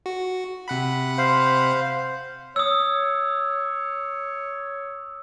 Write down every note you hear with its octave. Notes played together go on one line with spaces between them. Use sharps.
F#4
C3 F#5 B5
C5 F5
C#5 D#6 E6